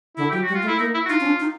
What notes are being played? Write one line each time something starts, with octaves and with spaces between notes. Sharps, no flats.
D3 E4
F#3 G4
F#4
G3
F4
A3
E4
A#3 D#4
E4
F#4
D#4 F4
C#4
D4
D#4